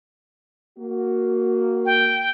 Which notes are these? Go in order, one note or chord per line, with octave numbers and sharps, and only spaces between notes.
A#3 F#4
G5